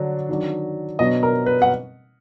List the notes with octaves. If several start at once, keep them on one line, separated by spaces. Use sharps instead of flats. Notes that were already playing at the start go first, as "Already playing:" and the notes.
Already playing: D3 F#3 D4
D#3 F#3 D4
B2 F#3 B3 D4 D#5
A#4
B4
F#5